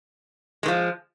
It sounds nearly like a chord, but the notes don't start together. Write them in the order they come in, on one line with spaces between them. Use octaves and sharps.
G#3 D#3 F3